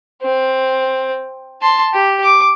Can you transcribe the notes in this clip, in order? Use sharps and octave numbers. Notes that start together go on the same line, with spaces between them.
C4
A5 C6
G4
D6